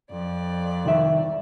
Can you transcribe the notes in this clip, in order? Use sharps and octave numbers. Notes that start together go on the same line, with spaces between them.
F2 D5
C2 D#3 E5